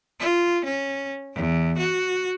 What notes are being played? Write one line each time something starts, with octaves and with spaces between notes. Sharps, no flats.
F4
C#4
E2
F#4